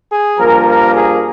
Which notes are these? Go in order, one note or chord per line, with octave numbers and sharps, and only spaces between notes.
G#4
G2 F3 A#3 A#4
A#4
G#4